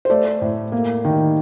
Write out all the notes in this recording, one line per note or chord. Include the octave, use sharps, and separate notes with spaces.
C5
A3 D5
A2
A#3
D#3